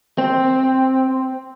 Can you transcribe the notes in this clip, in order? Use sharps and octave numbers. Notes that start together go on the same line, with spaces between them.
C4